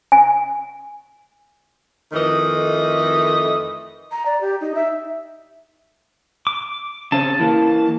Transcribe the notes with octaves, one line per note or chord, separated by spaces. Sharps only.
G#5
F2 D#3 E3 A3 D#5
A#5
D5
G4
D#4
E5
D6
C#3 C4 C#4 A5
E3 A#3